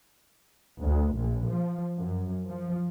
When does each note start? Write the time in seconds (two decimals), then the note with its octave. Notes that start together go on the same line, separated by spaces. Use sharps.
0.82 D2
1.18 A#1
1.49 F3
1.98 F#2
2.49 F3